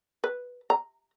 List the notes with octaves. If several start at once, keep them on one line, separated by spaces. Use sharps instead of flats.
B4
A#5